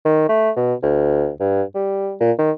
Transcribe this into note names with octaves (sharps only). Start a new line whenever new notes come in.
D#3
A3
B2
D2
G2
G3
A#2
D#3